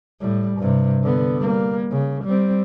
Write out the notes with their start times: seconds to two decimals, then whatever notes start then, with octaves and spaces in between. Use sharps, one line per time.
0.21 A2 G3
0.59 G2 C3
1.03 D3 B3
1.37 G3 A#3
1.91 C#3
2.25 G3 C4